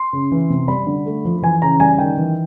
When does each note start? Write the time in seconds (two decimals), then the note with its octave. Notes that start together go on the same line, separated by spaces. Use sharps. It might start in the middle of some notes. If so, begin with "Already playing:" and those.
Already playing: C6
0.13 C#3
0.32 E3
0.50 C3
0.68 G3 B5
0.87 D3
1.06 A3
1.25 F3
1.42 E3 G#5
1.62 C#3 A#5
1.80 G3 G#5
1.98 D#3 G5
2.17 E3